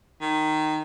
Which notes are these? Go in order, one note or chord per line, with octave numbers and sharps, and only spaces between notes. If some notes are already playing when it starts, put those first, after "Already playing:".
D#3